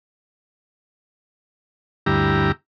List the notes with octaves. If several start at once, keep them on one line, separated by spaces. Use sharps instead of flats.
D2 G2 E4 G4 A#5